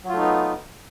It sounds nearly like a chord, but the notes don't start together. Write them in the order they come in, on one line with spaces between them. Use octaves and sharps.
F#3 F4 A3 D#4 B3